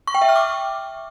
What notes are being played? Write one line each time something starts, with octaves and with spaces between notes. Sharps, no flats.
C#6
G5
E5
F6
D6